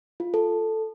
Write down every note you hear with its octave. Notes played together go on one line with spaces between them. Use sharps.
F4
A4